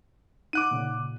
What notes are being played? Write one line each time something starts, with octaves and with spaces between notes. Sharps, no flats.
D#4 F#5 D6 F#6 D#7
A#2 C#3